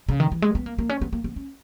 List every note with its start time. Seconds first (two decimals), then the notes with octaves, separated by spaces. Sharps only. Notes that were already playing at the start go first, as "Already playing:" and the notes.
0.09 C#3
0.20 D#3
0.32 E3
0.42 G#3
0.55 B3
0.66 A#3
0.78 A#3
0.89 C#4
1.01 B3
1.13 A#3
1.24 B3
1.36 C#4